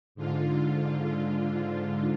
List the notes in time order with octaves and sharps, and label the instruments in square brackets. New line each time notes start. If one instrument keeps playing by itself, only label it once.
[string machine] G#2 D3 F4